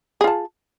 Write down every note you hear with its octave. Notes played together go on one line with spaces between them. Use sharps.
F4 G#4 A5